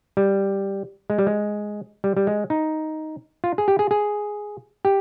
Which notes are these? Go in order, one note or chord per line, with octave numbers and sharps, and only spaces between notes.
G3
G#3
G3
G#3
G3
G3
G#3
D#4
F4
G#4
G4
G#4
G#4
G4